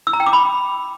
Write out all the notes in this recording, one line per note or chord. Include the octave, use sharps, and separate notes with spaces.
E6
A#5
G5
D6
B5